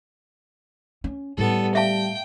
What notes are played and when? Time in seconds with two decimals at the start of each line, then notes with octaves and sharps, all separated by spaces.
1.04 C#4
1.38 A2 G3 B3 A4
1.75 E5 F5 G5 A5